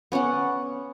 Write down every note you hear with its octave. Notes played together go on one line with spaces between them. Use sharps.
B3 C#4 D5 F#5